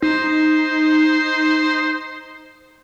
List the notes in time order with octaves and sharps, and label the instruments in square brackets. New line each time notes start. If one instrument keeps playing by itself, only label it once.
[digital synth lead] D#4 [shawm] C5